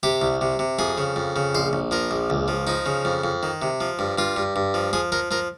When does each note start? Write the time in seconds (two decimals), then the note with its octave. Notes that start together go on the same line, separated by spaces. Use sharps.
0.03 C3 G4
0.21 C2
0.41 C3
0.59 C3
0.79 F2 G#4
0.98 C#3
1.16 F2
1.36 C#3
1.54 A#1 C5
1.73 A#1
1.91 F3 A#4
2.11 A#1
2.30 C#2
2.48 F3
2.67 F3 D#4
2.86 C#3
3.05 F2
3.24 F2
3.43 D#3
3.62 C3
3.81 F3
3.99 G2
4.18 G2 F4
4.36 G2
4.56 G2
4.74 F3
4.93 F3 G#4
5.12 F3 A#4
5.31 F3 A#4